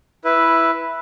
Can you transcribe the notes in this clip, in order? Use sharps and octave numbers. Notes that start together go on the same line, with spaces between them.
E4 B4